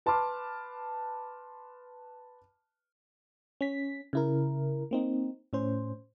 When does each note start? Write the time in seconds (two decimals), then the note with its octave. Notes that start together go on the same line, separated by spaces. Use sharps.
0.06 B4 A5 B5 C6 D6 F6
3.61 C#4 B6
4.13 C#3 E4 A#4
4.91 A#3 C4 D#4
5.53 A2 C#4 C5